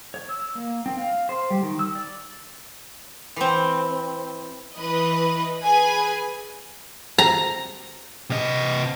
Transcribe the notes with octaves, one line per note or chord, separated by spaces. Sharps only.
C#5
E6
A#3
C4
F5
C5
G3
D#3
E6
D5
E3 C4
E3 B4 D#5
G#4 B4 G#5
A#5
C3 D#5